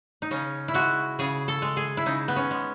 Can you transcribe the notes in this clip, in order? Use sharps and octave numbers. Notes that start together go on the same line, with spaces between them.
D#4
C#3 C#4
E4
G#3 F#4
C#3 G#4
A4
G#3
G#4
E4
C#3 D#4
B3
C#4
G#3